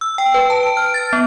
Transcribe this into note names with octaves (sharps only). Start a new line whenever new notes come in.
E6
G5
B4
A5
D7
F6
A6
B3